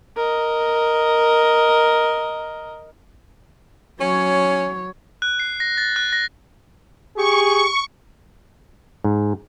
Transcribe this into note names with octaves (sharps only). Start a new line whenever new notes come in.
A#4 D#5
F#3 C#4 C#5
F#6
C7
A#6
A6
F#6
A#6
G4 G#4 C#6
G#2